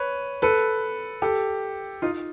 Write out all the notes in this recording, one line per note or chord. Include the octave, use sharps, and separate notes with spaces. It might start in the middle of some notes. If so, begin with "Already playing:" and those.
Already playing: B4 C#5
A4 B4
G4 A4
D#4 F4